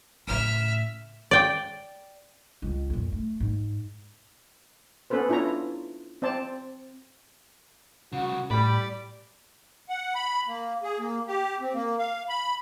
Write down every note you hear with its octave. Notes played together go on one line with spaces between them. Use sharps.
A2 C#3 E5 F6
D5 G5
C#2 G#3
F2 A#2
A3
G#2
B3 C#4 A4 B4 C5
D4 E4 F4 C#5 A#5
C4 C5 D5 A5
C2 C#3 F#4
A2 G3 D5 B5
F#5
B5
A#3
G#4
A#3
G4
C4
A#3
F5
B5